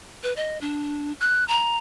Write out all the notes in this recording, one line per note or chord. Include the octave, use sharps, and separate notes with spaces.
B4
D#5
D4
F#6
A#5